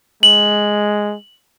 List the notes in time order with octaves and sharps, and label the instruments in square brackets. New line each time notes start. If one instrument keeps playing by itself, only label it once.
[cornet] G#3 [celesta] F#7